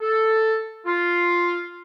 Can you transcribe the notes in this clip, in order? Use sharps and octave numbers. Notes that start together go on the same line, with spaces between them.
A4
F4